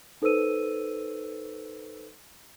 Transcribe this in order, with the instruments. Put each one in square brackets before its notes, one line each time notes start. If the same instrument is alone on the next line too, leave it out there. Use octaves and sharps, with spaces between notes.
[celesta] D#4 A4 B4 C5 E6 D#7